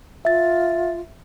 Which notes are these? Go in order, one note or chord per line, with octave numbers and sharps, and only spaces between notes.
F4 E5 A6